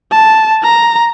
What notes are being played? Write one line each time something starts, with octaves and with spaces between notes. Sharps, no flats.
A5
A#5